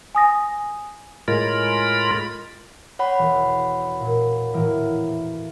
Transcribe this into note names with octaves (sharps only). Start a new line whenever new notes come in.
G#5 D#6 A#6
A2 G#3 F4 A#4 B5
C#5 F#5 B5
E1
A#2
A2 E3 A#3